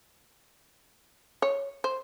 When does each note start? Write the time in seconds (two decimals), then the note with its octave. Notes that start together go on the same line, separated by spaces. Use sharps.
1.42 C#5
1.84 C5